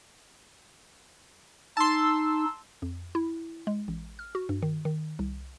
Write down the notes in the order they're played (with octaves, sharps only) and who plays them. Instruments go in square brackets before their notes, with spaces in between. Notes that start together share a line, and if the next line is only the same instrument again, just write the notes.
[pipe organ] D#4 [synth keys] A5 C6 [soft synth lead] E6
[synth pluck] F2
E4
G#3
A1
F6
F#4
G2
D#3
D#3
C2